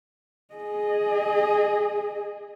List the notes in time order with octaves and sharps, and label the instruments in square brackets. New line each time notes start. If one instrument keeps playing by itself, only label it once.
[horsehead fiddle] G#4 D#5